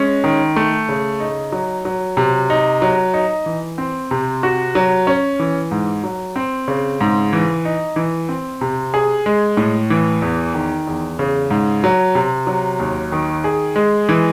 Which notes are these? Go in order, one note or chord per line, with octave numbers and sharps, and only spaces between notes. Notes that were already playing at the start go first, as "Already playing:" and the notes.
Already playing: G#3 C#4
D#3
A3
C#3
D#4
F#3
F#3
C3
D#4
F#3
D#4
E3
C4
C3
F#4
F#3
C#4
E3
G#2
F#3
C4
C#3
G#2
E3
D#4
E3
C4
C3
G#4
G#3
A2
E3
E2
D#3
E2
C#3
G#2
F#3
C3
F#3
D#2
D#3
G#4
G#3
E3